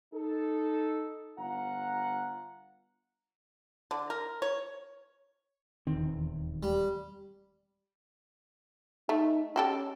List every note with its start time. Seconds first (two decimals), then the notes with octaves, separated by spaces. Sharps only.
0.14 D#4 A4
1.37 G1 F4 F#5 A#5
3.91 D3
4.10 A#4
4.42 C#5
5.87 D#1 E2 D#3 C4
6.63 G3
9.09 A3 D#4
9.56 C#4 F#4 G4 A4